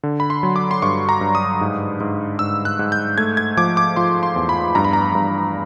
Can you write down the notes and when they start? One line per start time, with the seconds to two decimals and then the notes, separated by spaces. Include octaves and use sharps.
0.03 D3
0.20 B5
0.30 C6
0.43 F#3
0.56 D6
0.71 C6
0.82 G2 C#6
1.09 A#5
1.21 G2
1.35 D#6
1.61 G#2
2.00 G#2
2.39 G#2 E6
2.65 F#6
2.79 G#2
2.92 G6
3.18 A3 G#6
3.37 G#6
3.57 F3 D6
3.77 D6
3.96 F3 C6
4.23 C6
4.36 E2
4.49 B5
4.75 G2 A#5
4.84 B5
4.93 A#5
5.15 G2